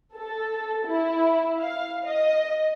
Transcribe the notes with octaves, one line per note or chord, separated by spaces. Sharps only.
A4
E4
F5
D#5